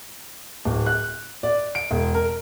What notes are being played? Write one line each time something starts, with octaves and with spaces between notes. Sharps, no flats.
D1
F#6
D5
D7
E1
A#4